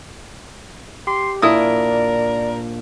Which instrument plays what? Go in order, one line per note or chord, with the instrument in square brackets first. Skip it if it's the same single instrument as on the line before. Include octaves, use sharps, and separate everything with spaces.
[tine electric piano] G4 [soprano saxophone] C6
[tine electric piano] A#2 A#3 D4 [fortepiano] E4 D#6 [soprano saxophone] A#4 [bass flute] D5